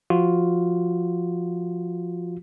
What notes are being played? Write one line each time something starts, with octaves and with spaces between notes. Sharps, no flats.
F3 F4 F#4